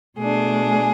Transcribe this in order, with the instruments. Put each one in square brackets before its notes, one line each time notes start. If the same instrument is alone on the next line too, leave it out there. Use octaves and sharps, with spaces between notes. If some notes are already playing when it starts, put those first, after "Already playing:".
[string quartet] B2 A3 D4 G#4